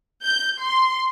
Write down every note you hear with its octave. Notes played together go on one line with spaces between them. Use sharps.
G6
C6